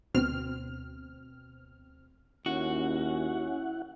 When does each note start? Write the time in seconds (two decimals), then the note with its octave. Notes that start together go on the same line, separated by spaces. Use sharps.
0.14 D2 B2 C4 F6
2.46 D#2 C#4 E4 F#4 F#5